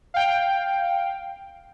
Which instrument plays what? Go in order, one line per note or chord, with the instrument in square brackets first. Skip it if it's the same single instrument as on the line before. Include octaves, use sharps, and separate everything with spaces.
[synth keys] F5 G5